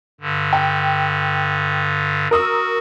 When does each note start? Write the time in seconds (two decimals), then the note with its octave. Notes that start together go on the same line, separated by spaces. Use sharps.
0.21 G2 D3
0.53 G5
2.31 F#4 A#4 D#6 E6